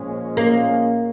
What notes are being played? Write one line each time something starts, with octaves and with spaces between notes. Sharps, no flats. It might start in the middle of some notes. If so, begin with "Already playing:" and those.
Already playing: A#2 F3 G#3 C#4
A#3